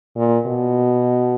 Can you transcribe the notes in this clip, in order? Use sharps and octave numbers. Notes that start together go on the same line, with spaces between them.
A#2
B2